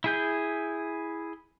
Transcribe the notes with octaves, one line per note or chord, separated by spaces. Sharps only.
E4 G#4 G6